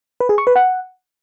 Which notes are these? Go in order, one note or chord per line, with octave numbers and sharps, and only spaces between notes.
B4
G#4
C#6
B4
F#5